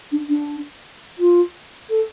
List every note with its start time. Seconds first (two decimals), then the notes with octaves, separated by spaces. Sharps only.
0.12 D4
0.29 D4
1.19 F4
1.90 A4